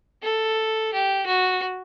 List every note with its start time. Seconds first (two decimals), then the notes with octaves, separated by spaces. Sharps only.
0.23 A4
0.93 G4
1.26 F#4